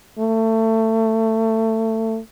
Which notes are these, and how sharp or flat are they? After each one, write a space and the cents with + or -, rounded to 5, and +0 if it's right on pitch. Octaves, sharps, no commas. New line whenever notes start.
A3 +25